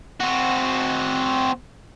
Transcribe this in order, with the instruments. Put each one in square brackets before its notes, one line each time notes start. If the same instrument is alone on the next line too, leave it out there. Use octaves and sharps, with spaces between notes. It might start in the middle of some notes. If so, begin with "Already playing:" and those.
[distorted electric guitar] C4 F#4